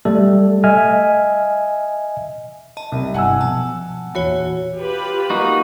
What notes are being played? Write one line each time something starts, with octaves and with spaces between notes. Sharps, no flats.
G3 A3 A4
D#5 E5 G#5 F6
D#5 A5
C2
G1 E4 F#5 G#5 E6
B2 F3 A5
A#1 E2 E3 F#4 C#5
F4 G4 B4
A#3 D#4 F#4